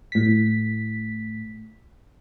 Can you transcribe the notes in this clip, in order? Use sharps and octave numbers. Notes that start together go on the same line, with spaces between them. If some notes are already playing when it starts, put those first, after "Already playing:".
A2 B6